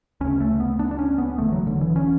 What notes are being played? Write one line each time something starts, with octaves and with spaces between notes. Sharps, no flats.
D2 C#3 C#4
A3
B3
D4
D4
C#4
B3
E1 E2 D3 A3
F#3
D3
E3
C#4